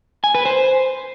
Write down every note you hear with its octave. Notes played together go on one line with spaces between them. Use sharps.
G#5
B4
C5